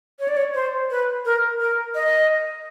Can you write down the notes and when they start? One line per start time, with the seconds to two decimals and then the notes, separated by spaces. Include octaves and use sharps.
0.19 C#5
0.28 D5
0.37 C#5
0.54 C5
0.90 B4
1.25 A#4
1.61 A#4
1.95 D#5